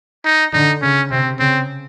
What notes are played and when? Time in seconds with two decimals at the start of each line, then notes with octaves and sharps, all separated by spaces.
0.25 D#4
0.53 D3 D#4
0.82 C#3 C#4
1.10 C3 C4
1.39 C#3 C4